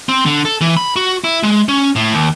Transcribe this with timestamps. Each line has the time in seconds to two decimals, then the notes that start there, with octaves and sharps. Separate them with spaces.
0.09 C4
0.26 D3
0.45 A4
0.61 E3
0.77 B5
0.96 F#4
1.24 E4
1.43 G#3
1.69 C#4
1.96 A2
2.13 D#2